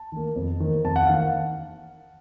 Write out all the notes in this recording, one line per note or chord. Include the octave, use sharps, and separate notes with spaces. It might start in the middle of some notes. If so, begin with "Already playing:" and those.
Already playing: A5
D#3 A#3
F2
D#3 A#3
F2 A5
F#5
D#3 A#3 F5